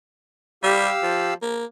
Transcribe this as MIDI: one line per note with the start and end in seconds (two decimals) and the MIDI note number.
0.63 0.90 55
0.63 1.34 67
0.63 1.34 77
0.63 1.34 88
1.03 1.33 53
1.42 1.65 58